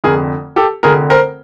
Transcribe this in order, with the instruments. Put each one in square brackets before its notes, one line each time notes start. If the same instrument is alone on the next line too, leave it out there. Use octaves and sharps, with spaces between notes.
[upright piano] F1 F2 D3 G#4 A#4
G4 A4
F1 F2 D3 G#4 A#4
A#4 C5